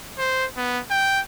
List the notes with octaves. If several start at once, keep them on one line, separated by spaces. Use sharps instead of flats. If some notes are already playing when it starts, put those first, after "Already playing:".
C5
B3
G5